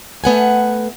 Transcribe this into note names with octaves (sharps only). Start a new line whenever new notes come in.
A3 B3 F#5 G#5